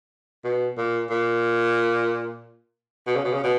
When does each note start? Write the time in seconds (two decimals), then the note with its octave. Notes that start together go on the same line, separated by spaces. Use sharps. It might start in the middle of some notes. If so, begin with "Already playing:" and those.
0.44 B2
0.78 A#2
1.10 A#2
3.07 B2
3.16 C#3
3.24 B2
3.33 C#3
3.44 B2